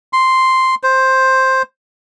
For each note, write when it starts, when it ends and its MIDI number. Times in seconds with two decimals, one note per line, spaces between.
0.13 0.75 84
0.83 1.62 72